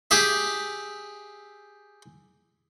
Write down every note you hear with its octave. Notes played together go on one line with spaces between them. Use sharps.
G4 G#4 E5